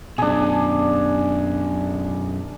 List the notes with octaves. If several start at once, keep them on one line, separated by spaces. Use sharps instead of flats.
F#2 B2 D4 G#4